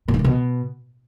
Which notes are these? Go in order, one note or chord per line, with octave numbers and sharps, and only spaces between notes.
A#2
G#2
A#2
B2